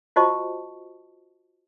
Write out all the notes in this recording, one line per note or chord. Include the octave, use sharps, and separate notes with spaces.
F4 F#4 C5 D#5 A5 C#6